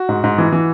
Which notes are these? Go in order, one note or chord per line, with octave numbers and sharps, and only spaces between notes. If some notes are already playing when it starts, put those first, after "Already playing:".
Already playing: F#4
G#2
G#2
E3
E3